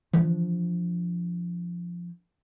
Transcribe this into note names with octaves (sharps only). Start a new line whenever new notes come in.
D3 E3 F3 D4